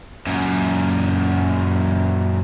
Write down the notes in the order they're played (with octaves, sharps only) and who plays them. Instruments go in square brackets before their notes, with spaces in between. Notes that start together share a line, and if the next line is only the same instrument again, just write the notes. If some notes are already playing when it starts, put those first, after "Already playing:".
[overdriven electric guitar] F#2 A#2